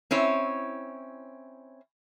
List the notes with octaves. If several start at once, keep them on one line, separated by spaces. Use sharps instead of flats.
C4 C#4 E4 C#5